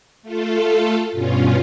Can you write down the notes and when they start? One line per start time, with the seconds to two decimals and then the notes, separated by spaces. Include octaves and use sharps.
0.22 A3 F4 A4
1.12 G2 B2 C#4 F4